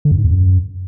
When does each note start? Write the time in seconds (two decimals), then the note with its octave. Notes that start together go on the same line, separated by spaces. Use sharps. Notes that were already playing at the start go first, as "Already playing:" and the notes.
0.05 D3
0.11 F#2
0.18 G#2
0.24 E2
0.31 F#2